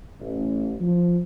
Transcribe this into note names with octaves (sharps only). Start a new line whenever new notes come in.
A1
F3